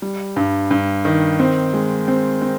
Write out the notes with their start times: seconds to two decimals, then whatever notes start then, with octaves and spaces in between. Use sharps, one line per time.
0.02 G3
0.36 G2
0.71 G2
1.05 D#3
1.39 C4
1.74 G#3
2.08 C4
2.42 C4